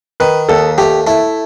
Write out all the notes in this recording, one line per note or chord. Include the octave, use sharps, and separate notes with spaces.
D#3 B4
D#2 A4
A3 G4
A3 E4